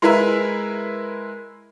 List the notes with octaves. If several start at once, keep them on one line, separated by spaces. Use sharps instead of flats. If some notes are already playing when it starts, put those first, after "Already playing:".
G#3 E4 A#4 B4 E5